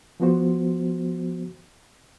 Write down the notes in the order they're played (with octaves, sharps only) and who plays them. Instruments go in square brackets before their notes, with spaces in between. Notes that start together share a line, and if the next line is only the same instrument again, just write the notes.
[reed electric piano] F3 B3 F#4 C5